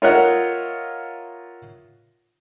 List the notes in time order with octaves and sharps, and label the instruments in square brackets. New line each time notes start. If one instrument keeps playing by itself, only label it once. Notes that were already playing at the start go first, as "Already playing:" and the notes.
[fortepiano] F4 A#4 C#5 D#5 E5 F#5